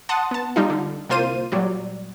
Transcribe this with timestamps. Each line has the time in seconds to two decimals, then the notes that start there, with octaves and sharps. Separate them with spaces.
0.09 F#5 A5 C6 D#6
0.31 B3 A5
0.56 G3 D#4 F4
0.70 D3
1.09 C2 A#3 F4 C5 D#7
1.52 A#2 F#3 G3 D5